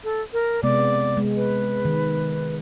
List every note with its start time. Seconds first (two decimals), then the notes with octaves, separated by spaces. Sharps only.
0.04 A4
0.33 A#4
0.63 C3 G#3 B3 D5
1.17 G#3
1.36 B4
1.85 D#3